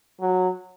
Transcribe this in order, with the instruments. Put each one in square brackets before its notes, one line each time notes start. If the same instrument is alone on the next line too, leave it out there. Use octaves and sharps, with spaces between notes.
[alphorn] F#3